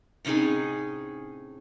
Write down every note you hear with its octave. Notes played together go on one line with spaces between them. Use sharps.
A2 C3 C#4 D#4 G#4